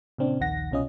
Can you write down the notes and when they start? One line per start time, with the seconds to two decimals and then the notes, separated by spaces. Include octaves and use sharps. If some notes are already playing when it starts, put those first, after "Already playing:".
0.18 A#2 C#3 C4 D4
0.40 A#1 D#2 D#3 F#5 A#6
0.71 C2 B2 C#4 F4 D#5